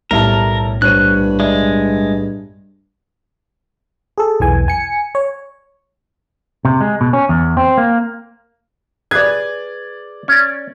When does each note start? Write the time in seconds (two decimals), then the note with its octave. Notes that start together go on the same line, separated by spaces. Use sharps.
0.11 B1 A2 G3 E4 A#4 A5
0.82 D#1 G2 C#5 F#6 D#7
1.40 G#3 D5 E5
4.18 G#4 A4
4.40 B1 E2 E3 G#5
4.68 G#5 C#7
5.15 C#5
6.65 C3
6.81 G#3
7.01 B2
7.13 C#4
7.29 E2
7.57 C4
7.78 A#3
9.11 G#4 B4 D5 G#6
10.28 C#4 D5